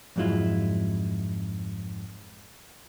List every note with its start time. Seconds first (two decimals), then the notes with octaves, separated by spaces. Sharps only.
0.16 F2 G#2 F#3 G#3 E4 F4